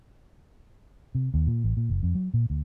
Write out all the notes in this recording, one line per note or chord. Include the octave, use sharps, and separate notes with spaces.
C3
D#2
A#2
A1
A#2
F#1
F2
F#3
A#2
D2